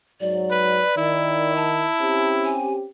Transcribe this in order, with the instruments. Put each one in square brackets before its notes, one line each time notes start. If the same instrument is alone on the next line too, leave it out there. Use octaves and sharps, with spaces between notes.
[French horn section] G#2 F#3 [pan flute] D5
[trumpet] B4
[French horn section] D#3 [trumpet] E4
[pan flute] A5
[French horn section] C4 C#4 G4
[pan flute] G#5